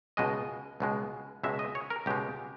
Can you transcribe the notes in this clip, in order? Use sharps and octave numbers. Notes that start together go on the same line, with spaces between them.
C#2 B2 G#3 D#5
C#2 B2 G#3
C#2 B2 G#3 E5
D#5
C#5
A#4
C#2 B2 G#3 G4